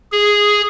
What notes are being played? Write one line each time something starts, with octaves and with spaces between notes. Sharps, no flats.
G#4